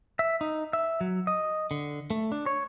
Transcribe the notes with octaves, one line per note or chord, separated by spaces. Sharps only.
E5
D#4
E5
F#3
D#5
D3
A3
D4
C#5